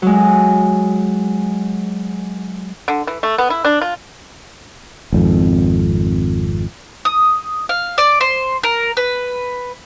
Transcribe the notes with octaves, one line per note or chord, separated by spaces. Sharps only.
F#3 G#3
D3
E3
A3
B3
E4
D4
F4
G#1 F2
D#6
F5
D5
C5
A#4
B4